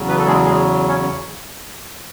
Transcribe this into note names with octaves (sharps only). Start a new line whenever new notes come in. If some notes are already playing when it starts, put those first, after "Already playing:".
Already playing: E2 C#3 F#3
B3 B4
A4
G#3 G#4
G#3 G#4
C#4 C#5